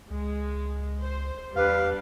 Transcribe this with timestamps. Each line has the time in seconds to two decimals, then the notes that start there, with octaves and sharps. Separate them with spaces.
0.11 C#2 G#3
1.01 C5
1.56 E2 G3 D4 G4 B4 F5